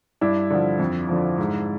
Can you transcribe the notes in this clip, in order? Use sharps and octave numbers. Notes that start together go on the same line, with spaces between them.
G2 D4 E4
D3 F3
F2
D3 F3
G#2